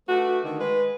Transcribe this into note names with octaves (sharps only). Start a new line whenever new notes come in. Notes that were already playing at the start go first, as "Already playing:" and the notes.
A3 D4 F#4 B4
D3 D#3
G#3 B4